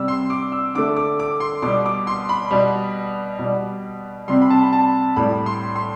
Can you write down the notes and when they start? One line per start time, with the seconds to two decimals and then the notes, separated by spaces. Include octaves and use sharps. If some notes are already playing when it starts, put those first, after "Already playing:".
Already playing: C3 G3 E6
0.08 C6
0.30 D6
0.52 E6
0.75 D3 A3 D6
0.97 D6
1.19 D6
1.40 C6
1.62 B2 G3 D6
1.86 D6
2.07 C6
2.29 B5
2.51 B2 G3
3.39 B2
3.44 G3
4.28 C3 G3 C6
4.42 B5
4.50 A5
4.63 B5
4.73 A5
5.16 A2 G3 B5
5.46 C6
5.76 C6